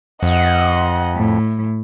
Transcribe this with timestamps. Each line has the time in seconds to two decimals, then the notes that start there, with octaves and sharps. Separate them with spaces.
0.23 F2 D#5 F#5
1.15 A2